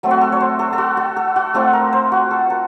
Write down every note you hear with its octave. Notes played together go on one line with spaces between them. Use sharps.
F#3 A3 C4
F#4
A4
C#5
C5
A4
A4
F#4
F#4
A4
F#4
A3 C4 F4 A4
A#4
C5
F#4
A4
A#4